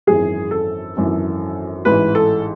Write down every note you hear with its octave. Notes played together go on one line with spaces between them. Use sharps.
G#1 F#2 E3 G#4
A4
G#1 F#2 E3
A1 G#2 E3 B4
A4